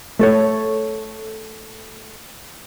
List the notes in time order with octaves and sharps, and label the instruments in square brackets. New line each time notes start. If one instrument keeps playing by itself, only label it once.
[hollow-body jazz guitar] A3 A4 C#5